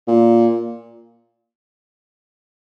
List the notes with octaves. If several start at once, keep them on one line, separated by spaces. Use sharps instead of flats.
A#2